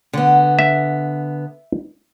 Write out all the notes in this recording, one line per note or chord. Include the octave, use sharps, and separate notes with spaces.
D3 B3
E5